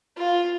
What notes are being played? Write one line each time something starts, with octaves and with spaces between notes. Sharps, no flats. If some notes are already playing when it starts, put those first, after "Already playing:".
F4